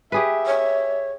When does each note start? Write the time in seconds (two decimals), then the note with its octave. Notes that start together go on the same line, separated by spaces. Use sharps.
0.12 G4 G#4 B4 E5
0.46 C#5